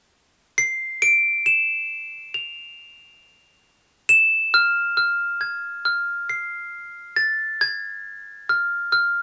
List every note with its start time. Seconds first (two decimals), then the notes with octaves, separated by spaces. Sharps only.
0.58 C7
1.02 D7
1.46 E7
2.34 F7
4.09 E7
4.54 F6
4.97 F6
5.41 G#6
5.85 F6
6.29 C7
7.16 A6
7.61 G#6
8.49 F6
8.92 F6